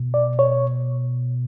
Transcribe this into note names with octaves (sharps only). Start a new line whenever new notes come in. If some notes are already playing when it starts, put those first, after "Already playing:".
Already playing: B2
D5
C#5